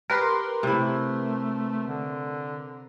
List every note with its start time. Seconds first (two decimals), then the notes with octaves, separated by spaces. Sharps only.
0.10 G4 A#4 B4 C6
0.63 C3 A3 E4
1.88 D3